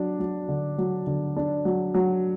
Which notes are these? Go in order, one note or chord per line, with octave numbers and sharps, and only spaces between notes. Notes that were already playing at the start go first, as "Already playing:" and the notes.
Already playing: F#3 D4
F#3
D3
F#3
D3
D4
F#3
F#3